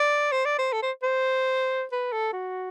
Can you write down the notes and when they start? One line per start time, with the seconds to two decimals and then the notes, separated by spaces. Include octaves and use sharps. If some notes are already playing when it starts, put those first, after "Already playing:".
Already playing: D5
0.32 C5
0.46 D5
0.59 C5
0.73 A4
0.82 C5
1.03 C5
1.92 B4
2.12 A4
2.33 F#4